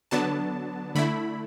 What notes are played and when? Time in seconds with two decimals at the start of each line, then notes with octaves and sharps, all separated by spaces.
0.11 D3 F#3 B3 D4 A5
0.95 D3 A3 E4 B5